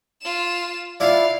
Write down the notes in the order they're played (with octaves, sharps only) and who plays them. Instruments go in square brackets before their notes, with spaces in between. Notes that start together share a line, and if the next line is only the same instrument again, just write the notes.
[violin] F4 E7
[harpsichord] D4 E4 F4 [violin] F5